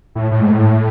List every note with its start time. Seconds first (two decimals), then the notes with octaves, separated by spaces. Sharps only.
0.15 A2
0.31 A2
0.41 G#2
0.50 A2